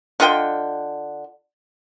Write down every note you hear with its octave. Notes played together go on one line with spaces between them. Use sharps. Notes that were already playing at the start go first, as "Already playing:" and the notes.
D3 F4 D#5 G5